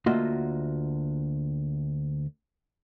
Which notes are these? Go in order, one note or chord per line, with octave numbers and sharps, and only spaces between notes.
D2 A#3 F4 F#4 D#5 E5